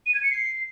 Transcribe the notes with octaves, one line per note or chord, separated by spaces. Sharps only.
D#7
G#6
C#7
C7